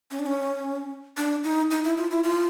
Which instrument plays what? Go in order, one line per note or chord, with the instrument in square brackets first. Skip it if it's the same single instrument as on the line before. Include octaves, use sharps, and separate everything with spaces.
[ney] C#4
D4
C#4
D4
D#4
D#4
E4
F4
E4
F4